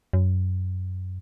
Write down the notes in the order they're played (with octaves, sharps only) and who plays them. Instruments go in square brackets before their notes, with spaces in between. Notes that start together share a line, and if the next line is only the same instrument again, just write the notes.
[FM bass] F#2